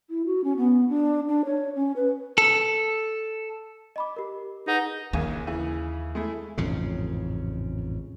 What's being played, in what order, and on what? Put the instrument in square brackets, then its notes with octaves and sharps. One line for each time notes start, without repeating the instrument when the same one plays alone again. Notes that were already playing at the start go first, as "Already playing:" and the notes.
[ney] E4
F#4
C#4
B3
D4
D4
C#5
C#4
B4
[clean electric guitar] A4
[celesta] D#5 B5 D6
G4 A#4
[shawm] D#4 [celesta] G#4 B4 F#5
[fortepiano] A#1 C#3 G#5 [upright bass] D#2
[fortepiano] C#3 E3
G#3 A3 E4
[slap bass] A1 F2 G#2 C#3